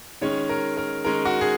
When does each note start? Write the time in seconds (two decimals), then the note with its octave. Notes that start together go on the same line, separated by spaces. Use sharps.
0.21 D#3 G#3 C#4 C#5
0.49 A#4
0.77 A#4
1.05 D#3 G#3 C#4 A#4
1.25 F#4
1.41 G#4